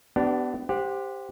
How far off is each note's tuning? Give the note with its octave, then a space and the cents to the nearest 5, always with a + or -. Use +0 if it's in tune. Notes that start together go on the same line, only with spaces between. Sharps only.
B3 +25 D4 +0 G4 -35
G4 +10 C5 +0 F#5 -20